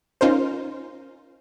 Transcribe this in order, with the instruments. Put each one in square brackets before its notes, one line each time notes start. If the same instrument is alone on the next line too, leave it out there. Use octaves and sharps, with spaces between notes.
[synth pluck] C#4 D#4 F4 A#4 C5